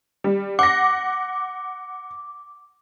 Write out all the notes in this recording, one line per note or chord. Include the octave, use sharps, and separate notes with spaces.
G3
F#5 D6 F#6 A#6